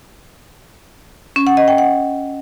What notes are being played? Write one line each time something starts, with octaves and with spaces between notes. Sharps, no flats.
C#4
F#5
D#5
G5
F#5